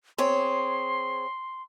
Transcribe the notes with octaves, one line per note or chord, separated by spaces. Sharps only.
C4 G#4 C#5 C6